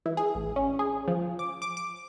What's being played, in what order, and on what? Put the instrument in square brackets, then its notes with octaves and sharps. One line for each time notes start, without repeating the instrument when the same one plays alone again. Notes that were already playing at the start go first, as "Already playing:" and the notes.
[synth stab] E3
G#4
A1
C#4
G#4
F3
D6
D6
D6